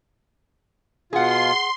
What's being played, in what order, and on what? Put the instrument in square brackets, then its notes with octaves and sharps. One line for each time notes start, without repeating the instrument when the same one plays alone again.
[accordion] B2 F4 [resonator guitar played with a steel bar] G#4 F#5 [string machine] C6